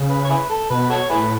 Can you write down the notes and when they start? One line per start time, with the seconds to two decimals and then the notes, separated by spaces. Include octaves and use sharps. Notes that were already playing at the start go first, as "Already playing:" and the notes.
Already playing: C#3
0.09 B4
0.24 C#5
0.30 E4 G#4 B4
0.49 A4
0.70 B2 B4
0.90 F#4 A4 C#5
1.10 A2 E4 G#4 B4